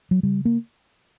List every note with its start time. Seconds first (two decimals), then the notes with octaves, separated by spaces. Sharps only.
0.11 F#3
0.23 C#3 G3
0.45 A#3